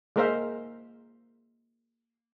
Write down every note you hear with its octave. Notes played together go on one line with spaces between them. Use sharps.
G#3 A#3 A#4 C5 E5 F5